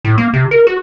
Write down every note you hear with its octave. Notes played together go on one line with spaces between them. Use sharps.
A2
A#3
C3
A#4
F#4